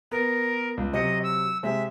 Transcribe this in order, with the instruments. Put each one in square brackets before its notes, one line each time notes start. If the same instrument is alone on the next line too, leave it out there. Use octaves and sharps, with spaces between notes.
[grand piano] B3 [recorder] A#4
[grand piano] C#2
[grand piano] C3 F#3 C#7 [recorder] D#5
[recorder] E6
[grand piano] C3 G#3 [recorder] E5